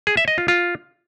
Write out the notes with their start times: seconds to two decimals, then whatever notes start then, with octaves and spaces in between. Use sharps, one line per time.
0.07 G#4
0.17 E5
0.28 D#5
0.38 F4
0.48 F4